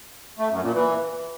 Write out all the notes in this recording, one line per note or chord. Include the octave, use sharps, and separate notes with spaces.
A3
F#2
A#2
E3